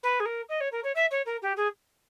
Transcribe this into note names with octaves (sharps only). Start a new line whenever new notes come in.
B4
G#4
A#4
D#5
C#5
A#4
C#5
E5
C#5
A#4
G4
G#4